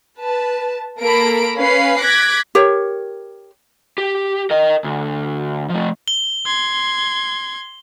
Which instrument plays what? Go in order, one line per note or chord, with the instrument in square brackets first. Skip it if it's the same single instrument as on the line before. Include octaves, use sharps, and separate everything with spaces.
[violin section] B4 A5
A#3 A4 A#4 B5 D7
C#4 B4 F5 B5 C7
D6 F#6 G#6 A#6 B6 D7
[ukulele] G4 A#4 C#5
[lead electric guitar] G4
A#4 D#5
D2
F3 A3
[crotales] G7
[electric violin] C6 G#6